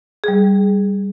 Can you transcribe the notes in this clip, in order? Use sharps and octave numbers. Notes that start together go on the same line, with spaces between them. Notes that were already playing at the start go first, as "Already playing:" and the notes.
G3 G#4